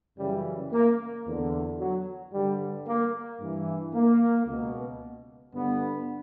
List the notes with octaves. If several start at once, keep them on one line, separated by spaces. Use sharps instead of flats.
F#2 C#3 E3 G3
A#3
E2 D3
F#3
G2 D3 G3
A#3
G2 E3
A#3
C#2 B2
G2 D3 B3